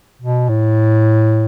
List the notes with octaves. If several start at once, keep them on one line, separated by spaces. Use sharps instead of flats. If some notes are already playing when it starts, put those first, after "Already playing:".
B2
A2